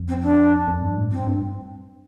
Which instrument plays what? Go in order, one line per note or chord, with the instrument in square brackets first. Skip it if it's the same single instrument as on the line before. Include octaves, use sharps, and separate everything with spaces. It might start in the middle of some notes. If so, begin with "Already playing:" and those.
Already playing: [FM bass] F2
[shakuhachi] C4
D4
[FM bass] F2
G2
A2
[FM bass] G2 [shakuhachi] C4
[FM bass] G2